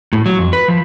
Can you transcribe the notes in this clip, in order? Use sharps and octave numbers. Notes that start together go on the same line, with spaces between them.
A2
F#3
F2
B4
F3